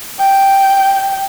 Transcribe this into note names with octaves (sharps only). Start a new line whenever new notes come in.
G5